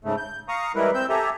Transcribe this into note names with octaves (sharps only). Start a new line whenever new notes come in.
G#2 C#3 A3
G6
F5 A#5 C#6 D#6
E3 G3 G#3 E4 A#4 B4
C4 E6 G6
G4 A4 E5 G#5 A#5